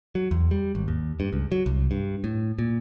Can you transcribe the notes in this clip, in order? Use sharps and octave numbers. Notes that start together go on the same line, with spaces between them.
F#3
E2
G3
G#1
D#2
G2
C#2
F#3
C2
G2
A2
A#2